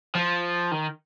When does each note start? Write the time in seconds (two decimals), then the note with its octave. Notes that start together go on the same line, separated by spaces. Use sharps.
0.15 F3
0.72 D#3